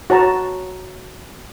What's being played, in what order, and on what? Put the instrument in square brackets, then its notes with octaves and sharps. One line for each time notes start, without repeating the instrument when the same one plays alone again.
[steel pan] F#4 C#5 A5 A#5